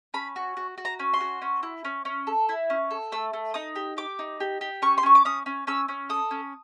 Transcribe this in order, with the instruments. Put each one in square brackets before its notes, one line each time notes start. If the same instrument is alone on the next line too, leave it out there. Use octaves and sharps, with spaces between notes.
[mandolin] C#4 B5
F#4
F#4
F#4
A#5
C#4
C6
F#4
C#4
E4
C#4
C#4
A4
E4
C#4
A4
A3 E6
A3
D#4 D#6
G4
G4 D6
D#4
G4
G4
C#4 C#6
C6
C#4 C#6
D6
C#4 D#6
C#4
C#4 E6
C#4
A4 D#6
C#4